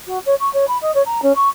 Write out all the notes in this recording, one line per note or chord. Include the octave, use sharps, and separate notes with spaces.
F#4
C#5
C#6
C#5
B5
D#5
C#5
A#5
C#4
C#6